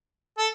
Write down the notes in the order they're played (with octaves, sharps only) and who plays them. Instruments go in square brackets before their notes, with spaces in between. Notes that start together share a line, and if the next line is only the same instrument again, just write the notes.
[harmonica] A4